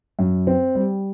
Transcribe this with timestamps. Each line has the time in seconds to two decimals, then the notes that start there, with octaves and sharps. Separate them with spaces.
0.19 F#2
0.47 C4
0.75 G3